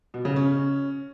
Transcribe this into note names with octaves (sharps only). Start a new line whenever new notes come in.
B2
C#3
C#4